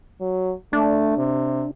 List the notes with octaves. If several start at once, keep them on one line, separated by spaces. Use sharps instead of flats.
F#3
A3 D4
C3